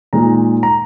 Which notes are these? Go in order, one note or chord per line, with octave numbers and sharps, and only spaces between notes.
A#2 G#3 D#4 A#5
A#5